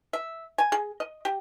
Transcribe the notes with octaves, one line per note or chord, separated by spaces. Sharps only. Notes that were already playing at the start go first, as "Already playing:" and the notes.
E5
G#5
G#4
D#5
G4